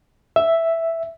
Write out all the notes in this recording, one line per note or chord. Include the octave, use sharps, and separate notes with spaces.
E5